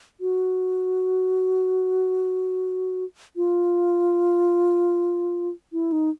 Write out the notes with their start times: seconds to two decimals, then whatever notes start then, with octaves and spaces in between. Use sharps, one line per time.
0.21 F#4
3.36 F4
5.73 E4
5.92 D#4